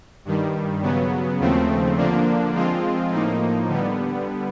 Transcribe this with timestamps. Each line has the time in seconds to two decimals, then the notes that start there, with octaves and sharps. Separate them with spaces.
0.25 G2 D#3 G3
0.82 C#3 F#3 B3
1.39 D#2 C#3 F3 A3 C4
1.97 D3 F3 A#3 D4
2.53 F3 G#3 C4 F4
3.10 A2 F3 A#3 D#4
3.68 D3 G3 B3